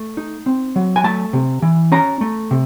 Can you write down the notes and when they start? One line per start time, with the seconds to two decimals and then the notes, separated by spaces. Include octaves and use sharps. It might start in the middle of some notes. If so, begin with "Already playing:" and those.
Already playing: A3
0.17 D#4
0.46 C4
0.76 F#3
0.96 G#5
1.04 A3 A5
1.33 C3
1.62 E3
1.92 C#4 A#5
2.21 A3
2.51 C3